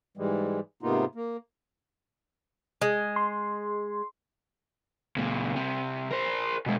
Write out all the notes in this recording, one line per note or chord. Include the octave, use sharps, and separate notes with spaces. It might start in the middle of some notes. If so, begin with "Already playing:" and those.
G#2 E3 G3 G#3
G#2 C3 A#3 B3 D#4 F4
A#3
G#3
C6
C#2 A#2
C2 C3
A#4 C5
B2 G#3